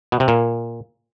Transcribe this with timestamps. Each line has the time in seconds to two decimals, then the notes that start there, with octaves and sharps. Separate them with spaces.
0.12 B2
0.20 C3
0.28 A#2